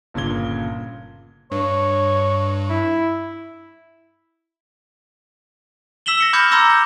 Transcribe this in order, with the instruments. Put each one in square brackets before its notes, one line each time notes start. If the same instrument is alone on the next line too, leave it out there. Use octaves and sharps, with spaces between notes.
[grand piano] G1 A#2 C#3 G#6 G7
[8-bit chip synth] G2 [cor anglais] C#5
[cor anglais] E4
[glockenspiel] E6 B6 E7 F#7 G7
A#6 C#7 F#7
B5 D6 F6 G6 G#6 C#7
A#5 C6 D6 E6 A#6 C#7
G6